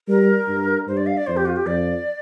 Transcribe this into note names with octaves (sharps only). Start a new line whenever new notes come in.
G3 A#4
G2
G2 C5
D5
F5
D5
F2 C5
G4
F4
G4
F2 D5